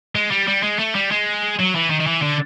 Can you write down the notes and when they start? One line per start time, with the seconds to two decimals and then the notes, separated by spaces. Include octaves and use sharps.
0.15 G#3
0.31 G3
0.47 G3
0.63 G#3
0.79 A3
0.95 G3
1.11 G#3
1.60 F#3
1.76 E3
1.90 D#3
2.01 D#3
2.07 E3
2.23 D3